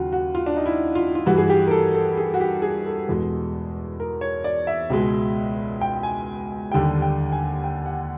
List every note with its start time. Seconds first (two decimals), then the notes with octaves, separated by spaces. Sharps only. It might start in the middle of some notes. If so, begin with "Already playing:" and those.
Already playing: D#2 C#3 F#3 F4 F#4
0.13 F#4
0.35 F4
0.46 D4
0.56 D#4
0.66 E4
0.95 F4
1.15 F4
1.26 G2 E3 G3 F#4
1.38 G#4
1.50 G4
1.67 A#4
1.71 A4
1.95 A4
2.18 G#4
2.34 F#4
2.41 G4
2.62 G#4
2.86 A4
3.09 E2 B2 G#3
4.00 A#4
4.21 C#5
4.44 D5
4.67 E5
4.90 C#2 B2 G#3
5.81 G5
6.03 G#5
6.72 D#2 D3 G3 G5
7.02 G5
7.32 G#5
7.64 G5
7.86 F#5